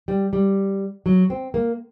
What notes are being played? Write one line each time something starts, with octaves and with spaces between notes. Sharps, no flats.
G3
G3
F#3
C4
A#3